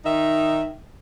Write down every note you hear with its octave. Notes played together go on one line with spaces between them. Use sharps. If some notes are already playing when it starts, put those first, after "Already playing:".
D#3 D#4 E5